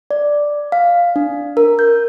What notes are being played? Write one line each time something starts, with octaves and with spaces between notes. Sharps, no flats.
D5
F5
D4
A#4
G6